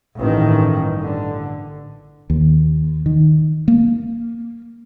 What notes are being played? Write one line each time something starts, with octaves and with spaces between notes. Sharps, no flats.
A1 G2 D#3 C#4
D3
D#2
D#3
A#3